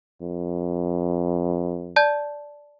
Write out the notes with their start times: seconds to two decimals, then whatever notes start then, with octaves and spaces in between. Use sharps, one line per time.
0.21 F2
1.96 D5 A5 G6